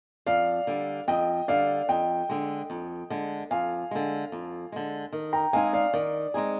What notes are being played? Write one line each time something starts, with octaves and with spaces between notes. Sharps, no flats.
F2 D5 F5
D3 G3
F2 D#5 G5
D3 G3 D5 F5
F2 D#5 G5
D3 G#3
F2
D3 G#3
F2 F5 G#5
D3 G#3
F2
D3 G#3
D#3
G5 A#5
G#3 C4 D#4 G#4 F5 G#5
D5 F5
D#3 D5
G#3 C4 D#4 G#4